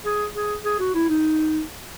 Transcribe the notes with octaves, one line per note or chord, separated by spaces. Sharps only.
G#4
G#4
G#4
F#4
E4
D#4